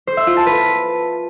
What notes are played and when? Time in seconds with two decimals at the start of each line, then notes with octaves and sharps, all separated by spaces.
0.07 C5
0.17 E5
0.27 F4
0.37 A5
0.46 B4